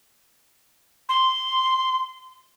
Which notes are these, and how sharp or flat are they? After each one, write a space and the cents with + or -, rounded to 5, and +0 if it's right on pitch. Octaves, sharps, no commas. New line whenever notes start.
C6 -10